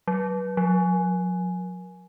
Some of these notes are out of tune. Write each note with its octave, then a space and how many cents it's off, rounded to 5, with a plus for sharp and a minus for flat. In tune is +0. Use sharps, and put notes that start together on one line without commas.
F#3 +15
F#3 -40